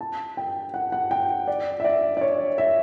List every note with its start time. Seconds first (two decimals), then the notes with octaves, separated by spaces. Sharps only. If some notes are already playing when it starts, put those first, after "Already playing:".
0.01 A5
0.37 G5
0.74 F#5
0.92 F#5
1.11 G5
1.48 D5
1.80 E5
1.84 D5
2.17 D5
2.21 C#5
2.58 E5